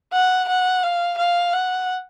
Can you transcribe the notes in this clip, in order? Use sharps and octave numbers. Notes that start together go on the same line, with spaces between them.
F#5
F#5
F5
F5
F#5